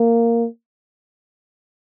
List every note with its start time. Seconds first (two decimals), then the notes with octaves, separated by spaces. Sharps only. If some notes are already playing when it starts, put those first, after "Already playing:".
Already playing: A#3